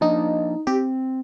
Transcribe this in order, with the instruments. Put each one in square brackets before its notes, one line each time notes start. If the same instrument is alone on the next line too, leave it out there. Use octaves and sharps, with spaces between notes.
[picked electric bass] F3 A#3 D4 [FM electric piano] D#4
[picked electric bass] C4 [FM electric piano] G4